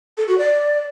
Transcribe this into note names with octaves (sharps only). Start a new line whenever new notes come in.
A4
F#4
D5